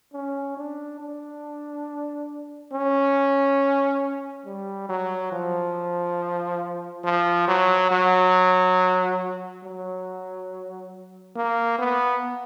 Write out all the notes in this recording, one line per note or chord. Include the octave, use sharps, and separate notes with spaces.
C#4
D4
D4
C#4
G3
F#3
F3
F3
F#3
F#3
F#3
A#3
B3